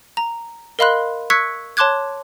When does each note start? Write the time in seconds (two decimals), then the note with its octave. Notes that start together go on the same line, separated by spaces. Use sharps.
0.17 A#5
0.79 A#4 D#5 F5 B5 C6 F#6
1.30 C#6 E6 F#6 G#6 B6 C#7
1.77 C#5 A5 C6 D6 F#6 G#6